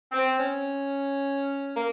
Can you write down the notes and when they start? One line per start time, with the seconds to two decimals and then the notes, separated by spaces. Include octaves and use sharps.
0.12 C4
0.37 C#4
1.76 A#3